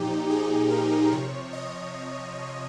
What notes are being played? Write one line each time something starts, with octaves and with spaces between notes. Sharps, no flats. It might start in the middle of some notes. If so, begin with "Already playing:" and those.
Already playing: A#2 F3 D#4 G4
G#4
A#4
C3 F3 C#5
D#5